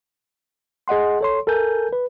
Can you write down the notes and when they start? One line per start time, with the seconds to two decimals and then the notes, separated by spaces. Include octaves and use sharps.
0.88 G#4 D#5 F#5 C6
1.21 A4 C#5 C6
1.47 A4 A#4 G#5 G6
1.93 B4